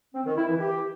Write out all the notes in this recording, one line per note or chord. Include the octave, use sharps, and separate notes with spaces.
C4
D#3
E4
E3
G4